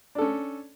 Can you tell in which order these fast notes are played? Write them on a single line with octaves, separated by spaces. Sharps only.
D4 A4 C#4